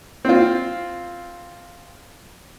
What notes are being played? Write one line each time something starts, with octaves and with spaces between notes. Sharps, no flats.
C4 F4